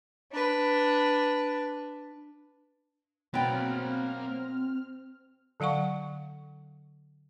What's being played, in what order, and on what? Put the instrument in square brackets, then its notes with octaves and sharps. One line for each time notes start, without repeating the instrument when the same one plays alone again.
[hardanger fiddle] D4 B4
[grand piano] B2 [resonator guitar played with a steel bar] F#3 G5 [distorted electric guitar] A#3 B5 [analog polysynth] C4 F6
[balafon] D3 F#3 F5 F#5 C#6